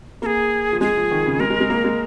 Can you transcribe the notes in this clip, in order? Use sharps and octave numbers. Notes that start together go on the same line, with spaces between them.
A#3 G#4 A#4
F3
G#3 G#4
F3
D#3
C#3
G#3 A#4
G#3
G#3
A#3
G#3